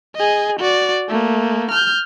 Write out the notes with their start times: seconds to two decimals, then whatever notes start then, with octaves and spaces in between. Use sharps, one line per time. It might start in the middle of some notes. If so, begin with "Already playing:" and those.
0.16 G#4 D#5
0.59 F#4 D5
1.09 A3 A#3
1.71 F6 G6